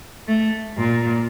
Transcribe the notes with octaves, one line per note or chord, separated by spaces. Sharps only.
A3
A#2